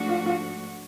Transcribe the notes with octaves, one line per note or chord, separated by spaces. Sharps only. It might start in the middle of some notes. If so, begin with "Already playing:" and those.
Already playing: G#2 F3 A3 D4 F#4
F4
F4